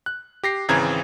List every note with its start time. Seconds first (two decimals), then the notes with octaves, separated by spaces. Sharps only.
0.06 F#6
0.43 G4 A#6 C7
0.68 G#1 C#3 E3 C4 A#5 G#6